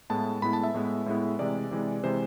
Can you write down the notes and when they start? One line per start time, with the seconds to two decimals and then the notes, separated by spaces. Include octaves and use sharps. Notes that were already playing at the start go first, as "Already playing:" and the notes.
0.10 A2 G#3 B3 E4 A5
0.42 A2 G#3 B3 E4 B5
0.53 A5
0.64 E5
0.74 A2 G#3 B3 E4
1.06 A2 G#3 B3 E4
1.39 C3 E3 G#3 D5
1.71 C3 E3 G#3
2.03 C3 E3 G#3 C5